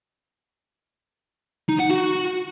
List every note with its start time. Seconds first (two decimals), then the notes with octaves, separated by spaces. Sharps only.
1.69 D#4
1.79 F#5
1.90 F#4